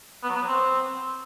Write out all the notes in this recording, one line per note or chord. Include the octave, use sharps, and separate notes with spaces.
B3
F#3
B3
F#3
C4